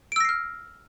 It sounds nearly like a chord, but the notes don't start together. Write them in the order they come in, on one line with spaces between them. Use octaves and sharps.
D7 E6 A#6 C7 F6